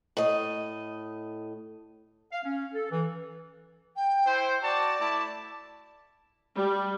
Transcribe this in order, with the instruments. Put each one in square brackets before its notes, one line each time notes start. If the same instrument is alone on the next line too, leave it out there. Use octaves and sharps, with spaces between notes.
[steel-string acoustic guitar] A2 D#5
[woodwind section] F5
C#4
A4
E3
[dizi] G5
[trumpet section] E4 C5
[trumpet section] F#4 A5 [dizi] D5
[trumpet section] A3 E4 A5
[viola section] G3